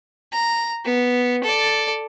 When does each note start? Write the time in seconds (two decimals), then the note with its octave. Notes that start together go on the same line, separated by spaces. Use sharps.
0.32 A#5
0.85 B3
1.44 A4 D5